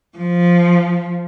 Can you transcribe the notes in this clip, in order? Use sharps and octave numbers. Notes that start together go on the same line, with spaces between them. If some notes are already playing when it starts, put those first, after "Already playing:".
F3